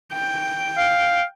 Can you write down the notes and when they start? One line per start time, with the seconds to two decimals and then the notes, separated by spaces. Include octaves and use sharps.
0.13 G5
0.77 F5